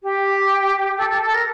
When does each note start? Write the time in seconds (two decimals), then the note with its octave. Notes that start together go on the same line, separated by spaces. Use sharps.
0.03 G4
0.97 A4
1.09 A4
1.22 A4
1.34 A#4